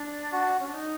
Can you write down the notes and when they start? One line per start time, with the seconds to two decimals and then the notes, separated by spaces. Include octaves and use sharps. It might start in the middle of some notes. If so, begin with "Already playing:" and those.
Already playing: D4
0.33 F#4
0.59 C#4
0.67 D4
0.74 D#4